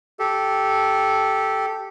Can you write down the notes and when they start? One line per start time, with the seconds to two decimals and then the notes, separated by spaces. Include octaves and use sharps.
0.19 G4 A4